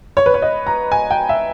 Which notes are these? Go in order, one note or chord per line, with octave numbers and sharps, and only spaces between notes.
C#5
B4
C#5
D#5
A#5
G#5
G5
E5